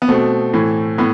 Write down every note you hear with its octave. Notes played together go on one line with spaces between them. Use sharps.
B3
B2 A3 C4
A2 E3
A2 B3